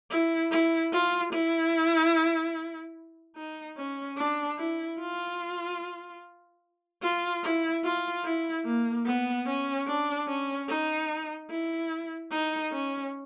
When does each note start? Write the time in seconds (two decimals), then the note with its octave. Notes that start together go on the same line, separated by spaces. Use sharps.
0.11 E4
0.51 E4
0.93 F4
1.33 E4
3.36 D#4
3.77 C#4
4.17 D4
4.58 E4
4.99 F4
7.02 F4
7.43 E4
7.84 F4
8.24 E4
8.65 A#3
9.06 B3
9.46 C#4
9.87 D4
10.28 C#4
10.69 D#4
11.50 E4
12.31 D#4
12.72 C#4